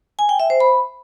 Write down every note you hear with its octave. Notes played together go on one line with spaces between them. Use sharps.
G#5
G5
E5
C5
B5